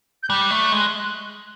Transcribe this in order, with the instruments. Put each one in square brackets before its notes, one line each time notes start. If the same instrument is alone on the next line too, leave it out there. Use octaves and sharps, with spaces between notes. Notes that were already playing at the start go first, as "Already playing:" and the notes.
[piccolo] G6
[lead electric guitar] G3 [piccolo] F#6
[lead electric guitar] A3
G#3